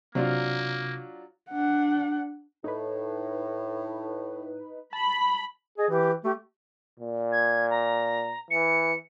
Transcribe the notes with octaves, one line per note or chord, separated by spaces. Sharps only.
C3 F#3 A#3 D4 F4
D4 F#5
A2 D#4 B4
A5 B5
G#4 D#5
E3 G4
A3 G4
A#2
G#6
A#5
E3 C#7